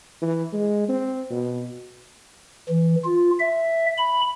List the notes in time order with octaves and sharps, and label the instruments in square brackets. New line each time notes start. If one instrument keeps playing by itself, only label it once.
[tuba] E3
G#3
C4
B2
[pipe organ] E3
F4
E5
B5